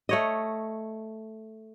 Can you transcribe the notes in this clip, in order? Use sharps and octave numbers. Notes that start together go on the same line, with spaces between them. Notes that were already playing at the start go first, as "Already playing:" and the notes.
A3 C#5 D#5